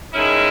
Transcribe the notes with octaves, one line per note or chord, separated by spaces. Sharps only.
D#3 G#3 C#4 E4